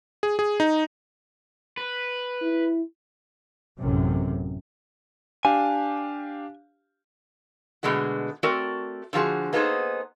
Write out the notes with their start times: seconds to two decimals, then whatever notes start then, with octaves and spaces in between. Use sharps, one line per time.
0.23 G#4
0.39 G#4
0.60 D#4
1.77 B4
2.42 E4
3.79 A1 F#2 C3
5.45 D4 G4 F5 G#5
7.83 B2 D3 G#3 A3 F#4
8.43 A3 C4 F#4 A#4 D5
9.13 D3 F3 F4 F#4 G#4
9.53 A#3 B3 D#4 G#4 A4 C5